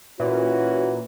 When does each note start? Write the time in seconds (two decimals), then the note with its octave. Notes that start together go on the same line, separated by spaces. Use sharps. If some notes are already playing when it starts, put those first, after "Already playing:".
0.20 A#2 E3 C#4 F#4